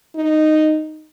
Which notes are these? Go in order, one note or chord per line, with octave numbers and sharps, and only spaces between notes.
D#4